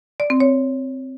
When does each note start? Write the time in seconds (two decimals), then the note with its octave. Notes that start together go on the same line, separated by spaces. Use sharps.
0.20 D5
0.30 C4
0.40 C#5